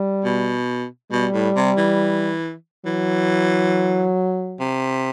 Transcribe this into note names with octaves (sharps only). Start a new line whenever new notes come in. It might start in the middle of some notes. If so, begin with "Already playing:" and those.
Already playing: G3
B2
B2 G3
A2
C3
E3
E3 F#3
C3